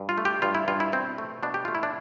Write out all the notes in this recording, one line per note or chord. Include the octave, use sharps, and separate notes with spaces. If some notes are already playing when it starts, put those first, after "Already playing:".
Already playing: G2
F4
A3
G4
G2 F4
E4
G2 F4
E4
B2 C4
A3
B2 D4
G4
A3 F4
E4
D4